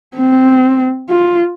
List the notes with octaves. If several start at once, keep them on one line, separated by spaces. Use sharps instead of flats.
C4
F4